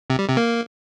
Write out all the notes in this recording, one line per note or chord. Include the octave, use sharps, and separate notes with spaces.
C3
G3
C3
A#3